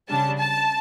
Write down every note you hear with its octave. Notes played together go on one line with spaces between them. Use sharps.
C#3 G3 D4 A5
A5